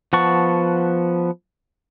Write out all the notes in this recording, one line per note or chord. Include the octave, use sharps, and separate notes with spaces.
F3 B3 F#5 A5 C#6